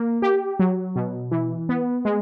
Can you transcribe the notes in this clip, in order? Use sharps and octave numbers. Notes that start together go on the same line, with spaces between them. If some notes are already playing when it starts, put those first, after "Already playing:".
Already playing: A#3
G4
F#3
B2
E3
B3
G#3